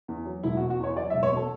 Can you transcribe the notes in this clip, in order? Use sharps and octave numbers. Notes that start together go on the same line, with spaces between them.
E2
F#3
E1 E4
F#4
B2
F#4
E2 C#5
F#3 D5
E5
E1
C#5
B2 A4